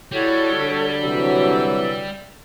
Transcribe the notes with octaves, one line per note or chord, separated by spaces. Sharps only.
G3 E4 F#4 A4 C#5
D3
C3 E3 F#3 E6